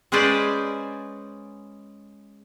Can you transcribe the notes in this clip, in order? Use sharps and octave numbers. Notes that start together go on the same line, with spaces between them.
G#3 C#4 G#4 B4 C5 D5